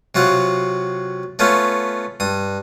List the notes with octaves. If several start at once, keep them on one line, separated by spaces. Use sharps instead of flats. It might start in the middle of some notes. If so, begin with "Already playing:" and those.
C3 F#3 F4 F#5
A3 B3 C#4 F4
G2 D#6